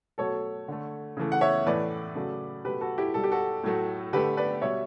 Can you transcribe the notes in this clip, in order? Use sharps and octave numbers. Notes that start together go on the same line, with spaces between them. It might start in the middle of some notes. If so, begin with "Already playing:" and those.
B2 F#3 A3 A4 C#5
D3 A3
C#3 E3 A3
F#5
C#5 E5
A2 E3 A3 B4 D5
C#3 F#3 A3
B2 F#3 A3 G4 B4
F#4 A4
E4 G4
B2 G3 A4
G4
F#4 A4
A2 F#3 A3
D3 A3 G4 B4
B4 D5
B2 G3 C#5 E5